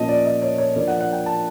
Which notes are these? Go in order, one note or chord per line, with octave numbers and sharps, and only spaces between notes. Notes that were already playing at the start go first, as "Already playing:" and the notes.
Already playing: A#2 F3 A#3 C#4 D#5 A5
D5
D#5
C#5
C#5
F3 A#3 D4 D5
F#5
F#5
G5
A5